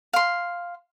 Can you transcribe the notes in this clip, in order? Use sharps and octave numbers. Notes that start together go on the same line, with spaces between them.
F5 C6